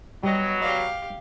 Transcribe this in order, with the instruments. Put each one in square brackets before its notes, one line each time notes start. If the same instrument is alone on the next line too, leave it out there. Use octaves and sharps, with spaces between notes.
[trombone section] B2 F#3 [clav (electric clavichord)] G3 [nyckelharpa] D#5
[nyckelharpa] G4 F5 [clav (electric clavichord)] D5 D#5